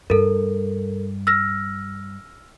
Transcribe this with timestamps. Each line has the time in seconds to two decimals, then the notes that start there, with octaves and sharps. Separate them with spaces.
0.10 G2 A4 A#4
1.27 E6 F6 A#6